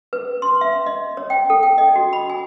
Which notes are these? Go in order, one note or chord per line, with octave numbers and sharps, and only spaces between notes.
B4
C6
E5
D#5
C#5
G5
A4
G5
D#5
F#4
B5
G#5